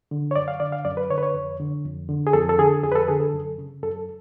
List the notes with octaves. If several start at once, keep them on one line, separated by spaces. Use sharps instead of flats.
D3
C#5
F#2 D5
F5
D3 D5
F5
F#2 D5
B4
D3 C#5
B4
C#5
F2
D3
F2
D3
G#4
F2 A4
A4
D3 G#4
F2 G#4
B4
A4
D3 G#4
A4
F#2
C#3
F#2 A4